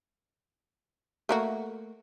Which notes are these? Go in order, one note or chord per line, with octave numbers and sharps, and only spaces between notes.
A3 A#3 F#4